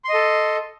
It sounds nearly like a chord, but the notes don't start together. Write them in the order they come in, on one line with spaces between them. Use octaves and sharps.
C6 D#5 A4